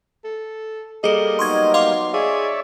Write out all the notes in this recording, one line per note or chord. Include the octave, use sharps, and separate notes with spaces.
A4
G3 A#3 G#4 A4 D#5
F#3 B3 D#4 C6 C#6 G#6
D#5 F5 C6 D6
G#4 C#5 D5 E5